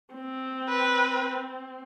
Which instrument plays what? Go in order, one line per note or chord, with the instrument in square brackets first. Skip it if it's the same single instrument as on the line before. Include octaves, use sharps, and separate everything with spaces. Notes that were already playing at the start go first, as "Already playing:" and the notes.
[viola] C4
[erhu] B4